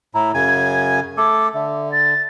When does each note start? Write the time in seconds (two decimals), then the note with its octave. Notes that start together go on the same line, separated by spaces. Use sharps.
0.14 A2 E4 A#5
0.34 F#2 C#3 G#5 G#6
1.17 A3 A4 D6
1.54 D3 E5
1.92 A6